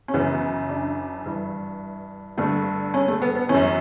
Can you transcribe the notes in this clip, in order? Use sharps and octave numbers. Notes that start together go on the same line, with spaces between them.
C#4
F#2 C#3 E3 B3
D4
G2 E3
G2 D3 A3
C#4
A3
B3
B3
F#2 E3 C#4